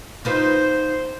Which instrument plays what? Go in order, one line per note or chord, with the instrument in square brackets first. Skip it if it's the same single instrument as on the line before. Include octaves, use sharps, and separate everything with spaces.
[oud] D#4 F4 B4 [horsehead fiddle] C5